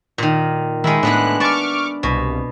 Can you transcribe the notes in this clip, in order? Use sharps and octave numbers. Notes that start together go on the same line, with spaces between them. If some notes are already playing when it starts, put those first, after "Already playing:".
A#2 D#3
D#3 G#3 E4
A2 G#3 B3 D4 F#6
D5 A5 C#6 D6 F6
C2 B2